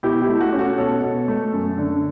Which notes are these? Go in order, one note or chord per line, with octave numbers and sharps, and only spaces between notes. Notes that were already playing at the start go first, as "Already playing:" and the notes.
B2 E4 G4
E4 G4
A3
F#4
C#4
F#4 A4
B2 A4 C#5
B2
A3
F#2
D3